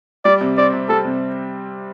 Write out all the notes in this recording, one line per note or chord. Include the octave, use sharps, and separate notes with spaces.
G3 D5
C3
C4 D5
C3
G3 A4
C3